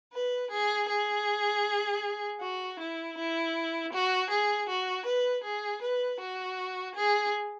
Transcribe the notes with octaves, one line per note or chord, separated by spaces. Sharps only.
B4
G#4
G#4
F#4
E4
E4
F#4
G#4
F#4
B4
G#4
B4
F#4
G#4